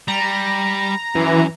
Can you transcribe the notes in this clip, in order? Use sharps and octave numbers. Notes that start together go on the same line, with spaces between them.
G3 A#5
F#2 E3